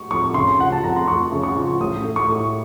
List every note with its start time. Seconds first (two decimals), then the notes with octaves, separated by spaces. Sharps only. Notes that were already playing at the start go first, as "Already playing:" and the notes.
Already playing: C#6
0.11 F2 C#6
0.34 C#3 C6
0.59 F3 F#5
0.72 A5
0.83 F2 A#5
0.96 C6
1.07 F2 C#6
1.32 C#3
1.43 C#6
1.56 F3
1.80 A1 D#6
2.04 A3
2.16 C#6
2.28 A2